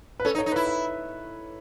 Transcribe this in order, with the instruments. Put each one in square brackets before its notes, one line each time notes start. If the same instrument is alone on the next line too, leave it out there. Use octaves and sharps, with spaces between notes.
[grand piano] B4
[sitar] C#4 [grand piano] A4
[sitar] D#4
[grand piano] C#5
[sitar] D#4
[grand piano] B4
[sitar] E4
[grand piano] E5